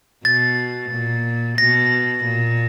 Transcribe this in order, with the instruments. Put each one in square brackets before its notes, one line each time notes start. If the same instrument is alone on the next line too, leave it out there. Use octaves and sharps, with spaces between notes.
[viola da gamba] B2 [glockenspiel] A6
[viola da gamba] A#2
[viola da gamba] B2 [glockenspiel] A#6
[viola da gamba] A#2